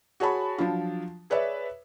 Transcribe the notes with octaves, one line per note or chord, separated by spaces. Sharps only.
F#4 G#4 C#5 A5 B5
F3 F#3 D4 F4
G#4 B4 C#5 D5 E5